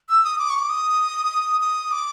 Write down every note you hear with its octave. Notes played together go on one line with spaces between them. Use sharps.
E6
D#6
D6
C#6
D6
D#6
D#6
D6